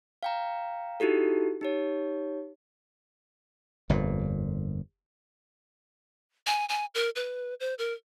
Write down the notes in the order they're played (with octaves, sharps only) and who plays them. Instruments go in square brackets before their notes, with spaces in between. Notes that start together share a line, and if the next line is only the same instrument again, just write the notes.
[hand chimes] F5 G5 A#5
D#4 E4 F#4 G4 A4
D#4 G4 C#5
[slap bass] G1 F2 A#2
[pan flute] G#5
G#5
A#4
B4
C5
A#4